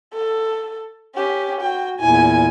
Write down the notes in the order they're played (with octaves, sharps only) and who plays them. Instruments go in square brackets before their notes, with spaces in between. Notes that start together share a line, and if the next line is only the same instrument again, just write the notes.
[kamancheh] A4
C#4 G4
[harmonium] F#4 [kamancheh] G5
[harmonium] E2 A#2 E4 [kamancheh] G#5